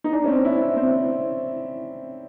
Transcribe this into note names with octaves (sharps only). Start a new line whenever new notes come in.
D#4
D4
C#4
C4
E4
E4
C4